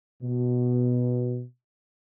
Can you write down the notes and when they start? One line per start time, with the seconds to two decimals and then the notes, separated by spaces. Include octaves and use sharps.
0.23 B2